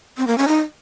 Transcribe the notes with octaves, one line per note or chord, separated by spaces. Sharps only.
C4
A#3
C#4
D#4